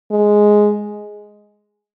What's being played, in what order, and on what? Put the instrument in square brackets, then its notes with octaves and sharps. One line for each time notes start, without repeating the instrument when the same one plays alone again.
[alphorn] G#3